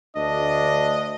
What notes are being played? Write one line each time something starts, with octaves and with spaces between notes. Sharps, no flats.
D2 D4 D#5